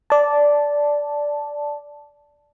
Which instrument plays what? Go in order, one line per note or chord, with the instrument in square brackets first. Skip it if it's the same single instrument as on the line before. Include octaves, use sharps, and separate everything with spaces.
[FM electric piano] D5 A5